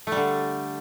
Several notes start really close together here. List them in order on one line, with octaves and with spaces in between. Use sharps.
A3 G3 D3